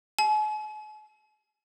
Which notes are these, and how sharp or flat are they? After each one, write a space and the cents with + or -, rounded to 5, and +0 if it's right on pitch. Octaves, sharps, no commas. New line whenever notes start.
G#5 +45